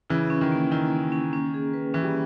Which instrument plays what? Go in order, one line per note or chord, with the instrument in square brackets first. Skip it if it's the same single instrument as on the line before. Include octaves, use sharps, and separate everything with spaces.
[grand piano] C#3 E3 [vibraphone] E4
[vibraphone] C#4
[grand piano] D#3
[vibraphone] A#3
[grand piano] D#3 [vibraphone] E4
[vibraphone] A#3
C#4
C#4
G#4
B4
[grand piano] E3 [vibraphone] C#4
[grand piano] G3